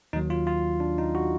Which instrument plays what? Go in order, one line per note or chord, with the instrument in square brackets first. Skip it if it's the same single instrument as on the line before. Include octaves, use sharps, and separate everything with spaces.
[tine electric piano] D#2 D#3 F#3 D#4
F4
F4
D4
D#4
F#4